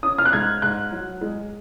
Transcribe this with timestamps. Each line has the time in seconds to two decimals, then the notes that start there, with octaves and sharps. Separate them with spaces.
0.03 C#4 D#6
0.18 F6
0.25 F#6
0.33 G#2 G#6
0.62 G#2 F#6
0.92 F#3
1.21 G#3